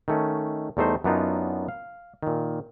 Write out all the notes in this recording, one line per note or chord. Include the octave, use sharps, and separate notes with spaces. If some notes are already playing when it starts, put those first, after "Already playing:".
D#3 A3 C#4
E2 G3 A3 D#4 C5
F#2 F#3 B3 D4 D#4 F4
F5
A#2 D#3